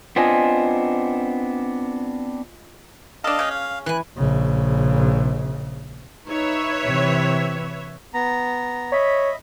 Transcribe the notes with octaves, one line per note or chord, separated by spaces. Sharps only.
B3 C4 D4 F4 D#5 G#5
D4 A4 D#5 F5
C#3 C#4
F5
E3 G#5 F#6
A#1 C#3
D#4 B4 C#5 E5
C3 E3
B3 A#5
C#5 D#5 E5 B5